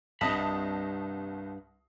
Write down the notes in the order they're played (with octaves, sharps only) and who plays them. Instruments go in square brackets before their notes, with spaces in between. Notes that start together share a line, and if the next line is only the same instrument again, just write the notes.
[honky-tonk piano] C2 A5 D#6 [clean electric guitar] G2 D#5 B5